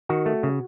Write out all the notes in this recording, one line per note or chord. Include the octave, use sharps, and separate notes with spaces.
D#3 F#4
A3
C#3